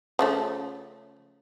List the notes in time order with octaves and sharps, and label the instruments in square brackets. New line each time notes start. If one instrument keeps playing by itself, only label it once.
[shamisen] C#3 F3 A3